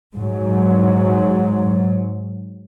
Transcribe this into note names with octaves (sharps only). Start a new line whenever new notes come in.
G#2 F#3